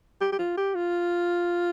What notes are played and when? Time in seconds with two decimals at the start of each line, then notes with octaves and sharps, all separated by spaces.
0.21 G4
0.32 G4
0.39 F4
0.57 G4
0.75 F4